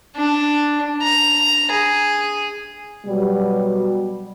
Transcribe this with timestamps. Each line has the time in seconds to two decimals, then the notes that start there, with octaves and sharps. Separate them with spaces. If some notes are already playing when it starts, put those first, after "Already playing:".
0.16 D4
1.02 A#5
1.71 G#4
3.06 B2 F#3 G3